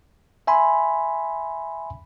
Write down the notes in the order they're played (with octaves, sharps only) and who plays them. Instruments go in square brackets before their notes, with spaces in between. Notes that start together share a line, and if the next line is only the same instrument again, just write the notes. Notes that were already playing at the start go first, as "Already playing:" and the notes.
[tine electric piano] E5 G#5 B5 C6